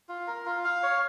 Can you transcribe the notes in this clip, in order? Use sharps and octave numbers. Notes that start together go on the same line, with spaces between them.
F4
A#4
F4
F5
C#5